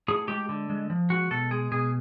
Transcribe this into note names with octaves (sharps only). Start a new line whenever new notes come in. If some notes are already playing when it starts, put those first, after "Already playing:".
A2 G#4
G#3 G4
D3
G#3
F3
G#3 F#4
B2 A4
G#3 G#4
B2 G#4